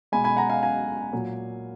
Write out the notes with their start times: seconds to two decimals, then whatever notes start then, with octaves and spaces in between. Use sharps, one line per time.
0.12 B2 G#3 G#5 B5
0.24 G#5 B5
0.37 F#5 A#5
0.49 F5 G#5
0.63 F5 G#5
1.13 A#2 F#3